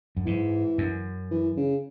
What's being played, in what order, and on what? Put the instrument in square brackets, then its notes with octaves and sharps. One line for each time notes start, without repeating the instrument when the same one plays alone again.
[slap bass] F#2
[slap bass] G#2 [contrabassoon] E3
[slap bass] F#2
[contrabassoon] E3
C#3